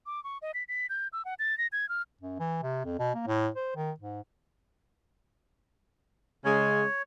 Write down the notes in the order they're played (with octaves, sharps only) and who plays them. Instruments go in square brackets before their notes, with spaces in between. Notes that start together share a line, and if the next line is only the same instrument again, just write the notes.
[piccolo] D6
C#6
D#5
B6
B6
G6
E6
F#5
A6
A#6
G#6
F6
[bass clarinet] F#2
E3
C3
F2
B2
A#3
A2
C5
D#3
G#2
[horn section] C#3 G#3 [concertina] C#5